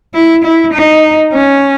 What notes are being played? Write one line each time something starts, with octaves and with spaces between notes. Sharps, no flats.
E4
E4
D#4
C#4